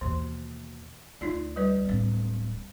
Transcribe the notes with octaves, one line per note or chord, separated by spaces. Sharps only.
D#2 B2 E3
D2 D#4 F4 D5
G3 B4 D5
D1 B3